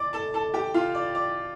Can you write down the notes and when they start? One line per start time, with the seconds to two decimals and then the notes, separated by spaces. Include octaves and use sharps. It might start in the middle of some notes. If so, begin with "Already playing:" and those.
Already playing: D5 D6
0.13 A4 A5
0.34 A4 A5
0.54 G4 G5
0.74 F4 F5
0.95 D5
1.15 D5